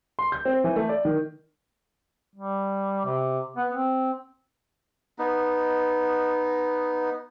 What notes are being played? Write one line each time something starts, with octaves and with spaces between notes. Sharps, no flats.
C6
G6
C4
E3
A3
D5
D#3
G3
C3
B3
C4
B3 D#4